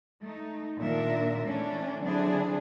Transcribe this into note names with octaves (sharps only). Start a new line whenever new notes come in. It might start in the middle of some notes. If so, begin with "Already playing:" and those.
A3 D#4
A#2 D#3 D4 A#4 E5
E3 A3 C#4 D4
D3 F#3 C4 D4 E4 G#4